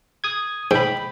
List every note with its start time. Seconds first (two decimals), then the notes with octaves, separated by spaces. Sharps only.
0.24 D#6 G#6
0.71 G#2 G5 B5